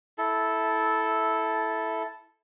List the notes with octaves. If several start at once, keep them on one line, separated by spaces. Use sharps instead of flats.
E4 A4